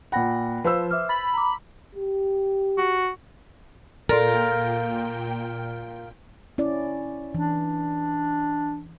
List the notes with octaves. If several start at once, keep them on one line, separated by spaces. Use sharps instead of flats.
A#2 F#5 G5 B5 A#6
F3 B4 C5 E6
E5 D6 F6
B5 A6
A#5 D6
G4
F#4
A#2 F4 A4 A#4 D5 G5 C6
C#4 E4 D5
E3 D4